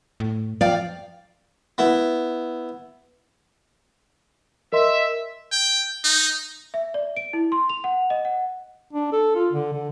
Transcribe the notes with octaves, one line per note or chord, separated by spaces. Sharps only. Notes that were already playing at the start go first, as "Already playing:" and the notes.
A2
F3 D5 F5 G5
B3 E4
A#4 D#5 E5 C6
G5
D#4
E5
D5
D7
E4
C6
F7
F#5
D#5
F#5
D4
A4
F4
D3
D3